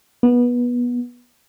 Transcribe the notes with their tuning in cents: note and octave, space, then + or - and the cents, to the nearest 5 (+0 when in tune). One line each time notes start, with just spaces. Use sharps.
B3 -20